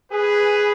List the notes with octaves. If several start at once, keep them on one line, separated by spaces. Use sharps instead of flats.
G#4 B4